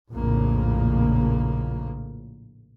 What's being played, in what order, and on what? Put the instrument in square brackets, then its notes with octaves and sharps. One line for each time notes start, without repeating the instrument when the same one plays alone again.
[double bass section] A#1 F2 A2 C#3 A#3